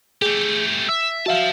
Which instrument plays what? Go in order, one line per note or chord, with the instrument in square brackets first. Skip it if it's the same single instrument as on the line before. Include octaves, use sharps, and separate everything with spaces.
[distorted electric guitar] A3 G4 [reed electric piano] G#4
[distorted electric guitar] E5 [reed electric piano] E6
[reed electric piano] F#4 E5 F5 [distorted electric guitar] C5 A5